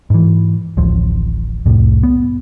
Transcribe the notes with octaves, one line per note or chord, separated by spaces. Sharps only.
G#2 E3
D1 A1 F3
C2 F2 A2
B3